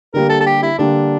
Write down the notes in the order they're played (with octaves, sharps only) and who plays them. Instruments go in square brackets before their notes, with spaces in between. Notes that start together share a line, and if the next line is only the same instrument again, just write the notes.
[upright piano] D3 G3 A#3 [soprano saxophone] A#4
[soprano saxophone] A4
A4
G4
E4
[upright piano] D3 G3 A#3 [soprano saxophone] D4